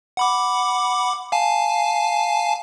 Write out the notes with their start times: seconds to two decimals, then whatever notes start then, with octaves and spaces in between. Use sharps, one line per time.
0.17 F#5 B5 D6
1.32 F5 G#5 A5